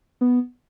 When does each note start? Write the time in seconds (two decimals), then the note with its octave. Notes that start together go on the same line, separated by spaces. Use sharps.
0.21 B3